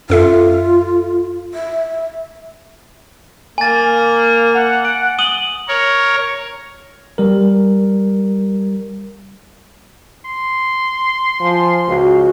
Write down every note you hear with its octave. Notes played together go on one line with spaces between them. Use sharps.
F#2 F4 A4 E5
E5
A#3 G#5 A6
F#5
D7
D#6 D#7 F#7 G7
A#4 C#5
G3 A#4
C6
F3 G#5
C#2 F#4